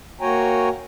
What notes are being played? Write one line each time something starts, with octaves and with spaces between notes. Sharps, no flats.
A#3 F#4 C#5 G5 G#5 A#5